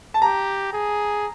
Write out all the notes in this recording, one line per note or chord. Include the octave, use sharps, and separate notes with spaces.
A5
G4 A#5
G#4